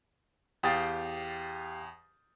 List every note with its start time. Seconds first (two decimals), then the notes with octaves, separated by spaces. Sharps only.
0.63 E2 G4 F5 G5 D#6 A6